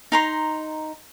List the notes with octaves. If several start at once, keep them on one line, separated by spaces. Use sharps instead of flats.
D#4 A#5 C6